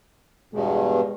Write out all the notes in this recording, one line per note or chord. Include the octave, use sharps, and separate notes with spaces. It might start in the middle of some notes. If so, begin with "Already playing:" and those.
E2 G2 B2 G#3